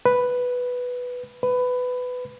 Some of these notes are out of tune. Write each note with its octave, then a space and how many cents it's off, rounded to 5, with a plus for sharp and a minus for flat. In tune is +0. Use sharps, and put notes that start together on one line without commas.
B4 +0
B4 +15